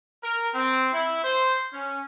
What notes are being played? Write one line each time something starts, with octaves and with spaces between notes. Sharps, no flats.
A#4
C4
E4
C5
C#4